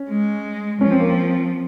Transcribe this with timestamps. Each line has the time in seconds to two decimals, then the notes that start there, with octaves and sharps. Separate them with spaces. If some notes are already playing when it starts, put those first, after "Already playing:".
Already playing: C#4
0.09 G#3
0.81 F3 C#4
0.91 C4
1.00 A#3
1.09 C4